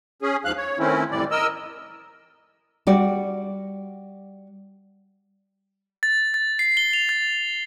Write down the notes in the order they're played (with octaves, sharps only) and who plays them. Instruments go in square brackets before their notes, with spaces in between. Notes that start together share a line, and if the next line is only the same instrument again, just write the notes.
[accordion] C#4 G#4
D#2 G#2 F3 F5 F#6
C#5
D#3 A3 C4 C#4 E4
F2 A2 E3 G3 D5
A#4 D#5 E6
[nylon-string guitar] G3 F#4 D5
[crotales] A6
A6
C7
G7
F7
A6